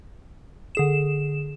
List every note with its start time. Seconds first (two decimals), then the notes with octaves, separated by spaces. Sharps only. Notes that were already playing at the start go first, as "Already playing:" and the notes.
0.75 D3 G#4 E7